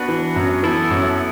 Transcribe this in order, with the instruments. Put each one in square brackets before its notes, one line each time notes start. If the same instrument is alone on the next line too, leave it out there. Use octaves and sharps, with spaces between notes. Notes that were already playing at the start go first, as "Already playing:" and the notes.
Already playing: [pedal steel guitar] B3 D4 F#4 B4
[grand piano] E3
F#2 F#3
[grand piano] E3 [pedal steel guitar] B3 E4 A4
[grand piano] F#2 F#3